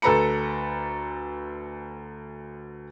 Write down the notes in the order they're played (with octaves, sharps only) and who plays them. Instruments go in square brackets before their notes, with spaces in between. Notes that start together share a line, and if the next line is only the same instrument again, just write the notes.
[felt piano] D2 A4 B4 A#5 B5 C#7